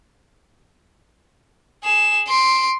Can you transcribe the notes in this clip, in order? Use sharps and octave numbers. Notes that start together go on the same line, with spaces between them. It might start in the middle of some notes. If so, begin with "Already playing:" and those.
G#4 E7
C6 D7